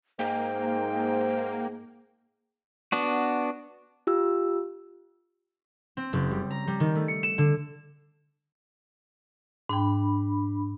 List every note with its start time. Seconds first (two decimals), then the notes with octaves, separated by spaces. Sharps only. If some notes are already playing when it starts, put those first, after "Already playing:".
0.19 G#2 A#3 G5
2.92 B3 D4 F#4
4.07 F4 G4 E6
5.97 C4
6.13 F#1
6.31 G3
6.51 A#5
6.67 G3
6.80 D#3
6.95 A3
7.08 C#7
7.23 E7
7.38 D3
9.69 G#2 D4 G5 B5